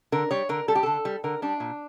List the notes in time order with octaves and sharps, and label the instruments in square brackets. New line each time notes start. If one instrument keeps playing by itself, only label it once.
[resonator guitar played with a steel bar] D3 A#4
G3 C#5
D3 A#4
G3 A4
G4
D3 A4
G3
D3 A#4
G3 D4
A#2